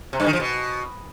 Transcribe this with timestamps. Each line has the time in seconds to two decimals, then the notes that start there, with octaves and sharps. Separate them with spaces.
0.13 C3
0.20 G2
0.26 D#3
0.33 F3
0.40 B2